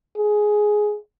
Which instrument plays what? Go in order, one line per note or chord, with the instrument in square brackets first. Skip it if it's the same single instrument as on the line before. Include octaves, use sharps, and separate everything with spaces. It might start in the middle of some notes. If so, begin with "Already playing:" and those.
[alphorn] G#4